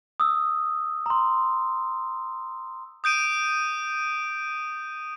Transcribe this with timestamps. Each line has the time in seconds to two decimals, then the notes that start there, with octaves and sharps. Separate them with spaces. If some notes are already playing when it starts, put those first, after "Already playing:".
0.20 D#6 E6
1.06 A#5 C6
3.04 D#6 G6 D7 D#7